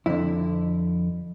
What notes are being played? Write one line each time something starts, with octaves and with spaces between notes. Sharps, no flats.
F2 D3 E4